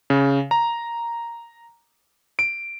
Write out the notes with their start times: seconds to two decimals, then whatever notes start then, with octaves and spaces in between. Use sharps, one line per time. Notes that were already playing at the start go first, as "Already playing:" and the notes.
0.10 C#3
0.51 A#5
2.39 D7